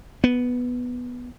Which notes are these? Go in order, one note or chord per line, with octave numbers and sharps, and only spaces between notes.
B3